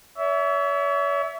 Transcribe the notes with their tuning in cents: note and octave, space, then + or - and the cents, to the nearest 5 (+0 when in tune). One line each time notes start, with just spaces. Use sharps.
C#5 +40 E5 +0